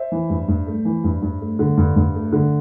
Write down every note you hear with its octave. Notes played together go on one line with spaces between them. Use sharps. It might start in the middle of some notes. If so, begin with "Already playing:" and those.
Already playing: C5 E5
E3
G2
G2
A3
E3
G2
G2
A3
D3
G2
G2
A3
D3